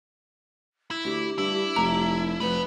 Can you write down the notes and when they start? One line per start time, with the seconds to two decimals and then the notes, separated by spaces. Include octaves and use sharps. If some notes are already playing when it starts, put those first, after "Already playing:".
0.91 E4
1.04 D2 G4
1.38 G2 E4
1.76 F1 A#5
2.40 F1 B4 F#5 B5